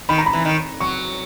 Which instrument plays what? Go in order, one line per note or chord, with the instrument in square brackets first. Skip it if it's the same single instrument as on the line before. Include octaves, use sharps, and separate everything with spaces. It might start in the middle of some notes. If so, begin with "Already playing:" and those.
[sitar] D#3 [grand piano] B5
[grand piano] A#5
B5
[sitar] E3
D#3
[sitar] F#3 [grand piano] C#6